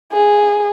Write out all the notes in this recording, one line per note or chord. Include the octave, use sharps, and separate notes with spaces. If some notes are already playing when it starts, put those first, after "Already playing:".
G#4